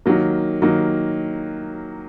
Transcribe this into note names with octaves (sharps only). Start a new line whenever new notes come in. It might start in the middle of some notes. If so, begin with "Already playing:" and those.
D#3 F#3 A#3
D#3 F#3 A#3